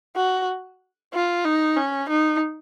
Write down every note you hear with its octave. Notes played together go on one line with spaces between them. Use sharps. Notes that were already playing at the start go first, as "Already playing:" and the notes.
F#4
F4
D#4
C#4
D#4